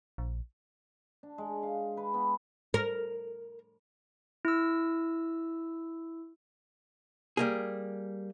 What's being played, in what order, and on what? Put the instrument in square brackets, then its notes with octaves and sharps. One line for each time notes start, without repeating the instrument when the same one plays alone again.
[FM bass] A#1
[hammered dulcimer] D4
G#3
F5
B4
B3
[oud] A#4
[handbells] E4 E6
[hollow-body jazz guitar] G3 A#3 G#4